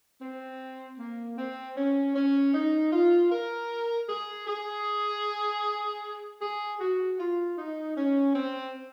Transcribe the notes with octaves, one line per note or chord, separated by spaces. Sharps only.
C4
A#3
C4
C#4
C#4
D#4
F4
A#4
G#4
G#4
G#4
F#4
F4
D#4
C#4
C4